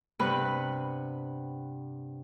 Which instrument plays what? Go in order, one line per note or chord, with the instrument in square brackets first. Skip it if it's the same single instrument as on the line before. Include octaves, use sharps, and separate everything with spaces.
[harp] G2 C3 B3 B4 B5 F#6